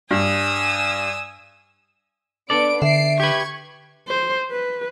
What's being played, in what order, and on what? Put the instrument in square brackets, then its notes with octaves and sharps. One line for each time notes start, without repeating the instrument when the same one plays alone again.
[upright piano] G2 [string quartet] G#5 D#6 E6
[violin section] B3 D4 D7 [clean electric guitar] A4 D5
[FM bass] D3 [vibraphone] E5 [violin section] C7 D7
[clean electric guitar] G4 B4 [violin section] C#6 G#6
[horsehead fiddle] C5
B4